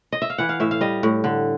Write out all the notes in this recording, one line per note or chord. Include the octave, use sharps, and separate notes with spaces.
D#5
E5
F5
E3 F#5
F5
A2 E5
F5
G3 D#5
A2
D3